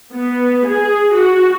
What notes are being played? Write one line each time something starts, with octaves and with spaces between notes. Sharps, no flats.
B3
G#4
F#4